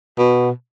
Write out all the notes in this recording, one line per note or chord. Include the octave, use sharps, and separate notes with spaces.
B2